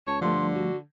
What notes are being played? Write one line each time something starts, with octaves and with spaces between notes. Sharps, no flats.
C#2 C#5 A5
G2 D3 F3 A3 C6
F#4